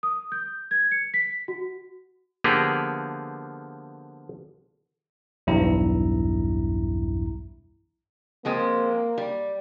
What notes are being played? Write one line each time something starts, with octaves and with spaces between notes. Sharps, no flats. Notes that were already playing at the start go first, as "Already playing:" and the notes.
D#6
G6
G#6
C#7
B6
F#4
D3 F3 A#3 B3 G4 G#4
B1 E2 G2 E4 A#5
F3 G#3 A#3 C4
G3